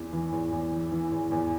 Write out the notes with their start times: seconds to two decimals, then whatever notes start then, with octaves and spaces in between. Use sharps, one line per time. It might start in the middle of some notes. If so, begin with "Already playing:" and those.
Already playing: E2 E3
0.13 E3
0.32 E2
0.52 E2
0.72 E3
0.92 E3
1.12 E2
1.32 E2